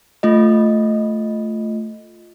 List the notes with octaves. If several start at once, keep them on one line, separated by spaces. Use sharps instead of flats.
A3 F4 D#5